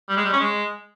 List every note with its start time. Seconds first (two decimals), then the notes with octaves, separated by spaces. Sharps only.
0.09 G3
0.17 G#3
0.25 G3
0.33 C#4
0.40 G#3